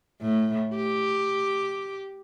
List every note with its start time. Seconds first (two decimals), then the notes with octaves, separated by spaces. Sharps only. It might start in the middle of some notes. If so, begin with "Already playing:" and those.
0.22 A2
0.76 G4